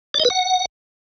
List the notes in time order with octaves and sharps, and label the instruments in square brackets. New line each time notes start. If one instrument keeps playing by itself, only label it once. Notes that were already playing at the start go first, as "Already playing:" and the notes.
[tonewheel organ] D5
D#5
B4
F#5